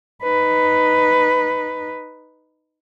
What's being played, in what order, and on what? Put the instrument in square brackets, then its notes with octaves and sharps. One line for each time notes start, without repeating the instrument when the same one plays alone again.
[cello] D#4 B4